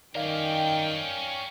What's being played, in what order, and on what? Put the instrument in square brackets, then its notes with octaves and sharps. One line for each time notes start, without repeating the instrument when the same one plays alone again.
[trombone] D#3 [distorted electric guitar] C#4 A#4 [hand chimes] D5 F5 [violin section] G5